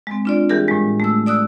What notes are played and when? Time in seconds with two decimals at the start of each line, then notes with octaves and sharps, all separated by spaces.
0.07 G#3 C4
0.25 D4 F4 D5
0.49 E3 G3 G4 G#4 A#4
0.68 A2 G#3
1.00 A3 E6
1.26 D5 D#6 E6 F#6